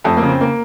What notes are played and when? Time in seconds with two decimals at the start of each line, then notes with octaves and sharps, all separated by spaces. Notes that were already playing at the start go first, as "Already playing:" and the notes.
0.04 F2 A3
0.17 A#3
0.22 C#3
0.29 C4
0.41 A#3